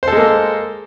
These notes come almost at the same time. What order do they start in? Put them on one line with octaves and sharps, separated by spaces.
C5 A4 G#3 A#3